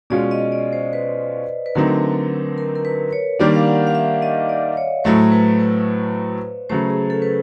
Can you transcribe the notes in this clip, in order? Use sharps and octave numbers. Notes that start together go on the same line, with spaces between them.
B2 G#3 C#4 F4 D5
D#5
D5
C5
B4
B4
D3 F#3 A3 C4 D#4 A#4
A#4
A#4
B4
C#5
D#3 G3 A#3 D4 D5
F5
F#5
F5
E5
D#5
D5
C#5
A2 F#3 A3 C5
B4
B4
C#3 F#3 A3 C5
G#4
A4
B4